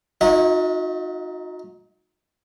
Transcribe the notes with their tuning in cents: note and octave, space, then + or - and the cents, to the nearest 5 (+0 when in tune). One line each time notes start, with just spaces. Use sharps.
D#4 +0 F#4 -40 D#5 +45